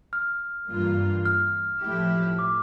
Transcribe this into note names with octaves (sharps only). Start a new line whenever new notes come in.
F6
G2 E3 G3 A#3 F4
F6
A2 F3 A3 E4 G4
D6